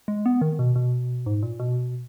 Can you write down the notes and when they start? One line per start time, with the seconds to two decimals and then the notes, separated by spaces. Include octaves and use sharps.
0.08 G#3
0.26 B3
0.42 D#3
0.59 B2
0.76 B2
1.26 G#2
1.43 A#2
1.60 B2